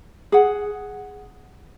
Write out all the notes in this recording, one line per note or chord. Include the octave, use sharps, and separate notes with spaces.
G#4 F#5